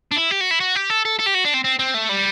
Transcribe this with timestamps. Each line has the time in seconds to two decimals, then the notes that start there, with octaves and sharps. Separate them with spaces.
0.11 D4
0.16 E4
0.31 G4
0.41 F#4
0.51 E4
0.60 F#4
0.75 G4
0.90 A4
1.05 A4
1.20 A4
1.27 G4
1.35 F#4
1.45 D4
1.54 C4
1.64 C4
1.79 C4
1.94 A3
2.09 G3